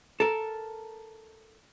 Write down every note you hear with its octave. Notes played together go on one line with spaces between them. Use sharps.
A4 A#4